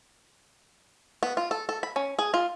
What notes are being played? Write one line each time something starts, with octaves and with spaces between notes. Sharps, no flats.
B3
F4
A4
A4
B5
C#4
G#4
F4